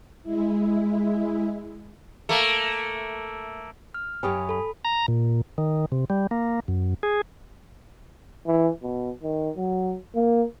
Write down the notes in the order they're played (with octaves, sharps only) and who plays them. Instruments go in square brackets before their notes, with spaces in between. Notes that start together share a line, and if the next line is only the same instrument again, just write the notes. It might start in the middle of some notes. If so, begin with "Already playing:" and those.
[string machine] G#3 E4
[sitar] A3 A#3
[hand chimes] F6
[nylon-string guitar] F#2 G4 C#5 [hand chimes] G#5 B5 D#6
[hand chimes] A4 B5
[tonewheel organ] A#5
A#2
D#3
C3
G3
A#3
F#2
G#4
[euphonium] E3
B2
D#3
F#3
A#3